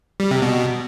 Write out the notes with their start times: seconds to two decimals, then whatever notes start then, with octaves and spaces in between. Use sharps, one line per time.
0.20 G3
0.31 C3
0.42 B2